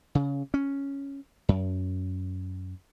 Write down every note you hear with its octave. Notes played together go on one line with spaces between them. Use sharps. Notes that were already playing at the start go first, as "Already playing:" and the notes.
C#3
C#4
F#2